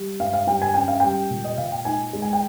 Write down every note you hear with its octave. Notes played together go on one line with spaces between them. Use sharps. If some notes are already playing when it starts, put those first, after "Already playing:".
Already playing: G3
G2 F5
F5
G2 G5
G#5
C#4 G5
F5
G3 G5
A#2
D#5
A#2 F5
G5
D#4 G#5
G#3
G#5
G5